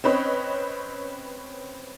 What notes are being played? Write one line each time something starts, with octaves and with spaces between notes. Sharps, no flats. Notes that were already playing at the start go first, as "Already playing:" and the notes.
C4 C#4 B4 C#5 D#5